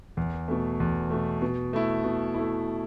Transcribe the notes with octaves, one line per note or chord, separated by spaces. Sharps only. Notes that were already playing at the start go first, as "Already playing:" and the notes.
E2
B2 A3
E2
B2 A3
B2
A3 E4
B2
A3 E4